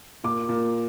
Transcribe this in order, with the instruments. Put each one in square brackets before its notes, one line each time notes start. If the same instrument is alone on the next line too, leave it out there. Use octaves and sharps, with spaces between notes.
[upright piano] A#2 D6
A#2